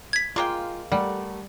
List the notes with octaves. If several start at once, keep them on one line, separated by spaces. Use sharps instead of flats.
G#6 B6
G#3 A#3 F4 G5
G3 A3 A#4 F#5